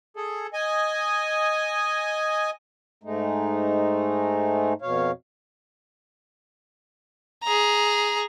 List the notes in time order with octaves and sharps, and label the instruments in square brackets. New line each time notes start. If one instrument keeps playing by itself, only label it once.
[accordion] G#4 A4
D#5 G#5
[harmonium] G#2 G#3 A3 D#4
F2 B2 C#5 F5
[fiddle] G#4 A#5